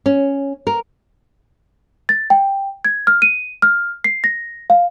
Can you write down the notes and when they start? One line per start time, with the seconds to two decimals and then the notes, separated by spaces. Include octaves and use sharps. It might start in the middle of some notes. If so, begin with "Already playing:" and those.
0.06 C#4
0.67 A#4
2.09 A6
2.30 G5
2.85 G#6
3.07 F6
3.22 D#7
3.62 F6
4.04 C7
4.24 A#6
4.70 F5